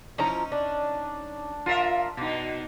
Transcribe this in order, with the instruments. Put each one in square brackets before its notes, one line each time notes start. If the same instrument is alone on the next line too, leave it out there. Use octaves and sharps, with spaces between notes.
[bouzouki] F3 E4 A#5 [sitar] C#4 D#4
[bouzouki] D4
[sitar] F4 A#4 E5
B2 D#4